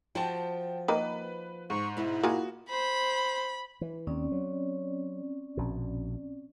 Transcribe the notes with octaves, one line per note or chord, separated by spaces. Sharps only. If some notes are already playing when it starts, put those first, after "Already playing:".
F3 F#4 C5 G5 A5
D#3 A#3 B4
G#2 C#6
B2 B3 E4
A#3 F4 F#4 G#4
C5 B5
E3
D#2 C4 C#4 D5
F#3
A#1 B2